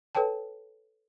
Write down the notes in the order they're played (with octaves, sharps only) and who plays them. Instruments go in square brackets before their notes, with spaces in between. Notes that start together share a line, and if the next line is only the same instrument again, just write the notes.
[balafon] A4 B4 C#5 G5 A5